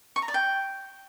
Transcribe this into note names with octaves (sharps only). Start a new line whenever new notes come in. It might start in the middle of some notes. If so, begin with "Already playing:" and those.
C#6
A#5
D5
G5